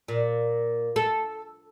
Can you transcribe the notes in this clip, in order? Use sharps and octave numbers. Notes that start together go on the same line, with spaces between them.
A#2
A4